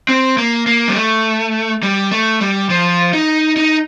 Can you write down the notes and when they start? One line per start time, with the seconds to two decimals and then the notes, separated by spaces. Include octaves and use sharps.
0.09 C4
0.38 A#3
0.67 A#3
0.88 G3
0.95 A3
1.83 G3
2.12 A3
2.41 G3
2.70 F3
3.13 D#4
3.57 D#4